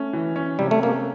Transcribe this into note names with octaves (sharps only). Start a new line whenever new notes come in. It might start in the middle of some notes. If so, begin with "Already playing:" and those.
Already playing: A3 C#4
E3
C#4
C3 G3
A3
A#3 C#4